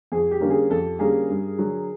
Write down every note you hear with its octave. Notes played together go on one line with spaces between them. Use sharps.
F2 G#4
G4
D3 G3 A#3 C#4
G#4
F2 G4 A4
D3 G3 A#3 C#4 G#4 A#4
G2
D3 F#3